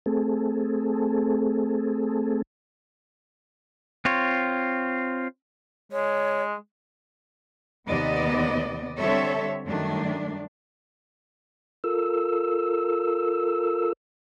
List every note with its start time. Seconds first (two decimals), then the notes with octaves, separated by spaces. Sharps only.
0.06 A3 C4 G#4 A4
4.05 C4 F4 C#5
5.92 G#3 C#5
7.87 D#2 C3 B3 C4 D5 D#5
8.98 D3 G3 C4 A4 C#5 E5
9.66 F#2 D#3 G3 A3 D4
11.84 F4 A4 A#4 E6